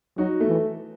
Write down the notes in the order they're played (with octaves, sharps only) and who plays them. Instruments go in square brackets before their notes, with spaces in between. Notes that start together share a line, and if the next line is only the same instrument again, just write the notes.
[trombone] F#3 [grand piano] D#4 F#4
[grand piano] A3
[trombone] E3